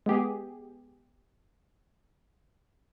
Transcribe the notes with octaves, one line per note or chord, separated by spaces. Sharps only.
G#3 B3 G4 G#4